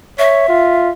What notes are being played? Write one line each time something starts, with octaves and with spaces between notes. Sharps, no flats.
C#5 E5
F4